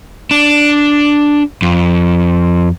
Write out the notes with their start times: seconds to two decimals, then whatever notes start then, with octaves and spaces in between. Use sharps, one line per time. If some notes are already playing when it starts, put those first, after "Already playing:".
0.31 D4
1.62 F2